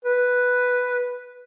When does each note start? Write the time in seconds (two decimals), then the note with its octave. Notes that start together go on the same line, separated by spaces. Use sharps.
0.05 B4